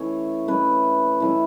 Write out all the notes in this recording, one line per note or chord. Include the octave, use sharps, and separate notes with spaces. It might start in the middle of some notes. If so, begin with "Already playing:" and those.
Already playing: E3 A3 C#4 C#5
E3 A3 C#4 B4
E3 A3 C#4